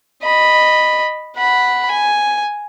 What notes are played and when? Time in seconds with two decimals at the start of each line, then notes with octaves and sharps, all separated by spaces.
0.23 D#5 B5
1.37 F#5 B5
1.91 G#5